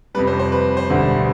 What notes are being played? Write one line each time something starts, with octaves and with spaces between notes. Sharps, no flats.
F2 C3 G3 B4
C5
C5
B4
C5
E1 D2 D3 G3